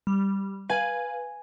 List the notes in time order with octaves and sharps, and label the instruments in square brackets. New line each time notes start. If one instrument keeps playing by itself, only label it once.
[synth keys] G3
[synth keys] B4 F5 [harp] G#5